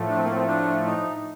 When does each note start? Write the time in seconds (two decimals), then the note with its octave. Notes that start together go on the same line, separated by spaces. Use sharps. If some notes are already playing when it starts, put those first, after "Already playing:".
Already playing: A2 F3 A3
0.09 D4
0.17 C4
0.25 A#3
0.33 C4
0.47 D4
0.85 D#4